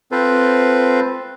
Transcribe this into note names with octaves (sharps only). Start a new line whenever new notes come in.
C4 F4 A4 B4 C5